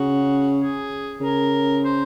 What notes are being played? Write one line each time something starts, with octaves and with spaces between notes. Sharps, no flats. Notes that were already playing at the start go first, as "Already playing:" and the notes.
Already playing: C#3 F#4
G#4
C#3 A#4
C5